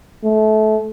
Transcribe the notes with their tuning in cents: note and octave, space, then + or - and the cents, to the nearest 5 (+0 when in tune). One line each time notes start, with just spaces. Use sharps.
A3 -25